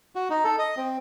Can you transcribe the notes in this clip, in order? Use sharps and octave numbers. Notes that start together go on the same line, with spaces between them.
F#4
D#4
A4
D#5
C4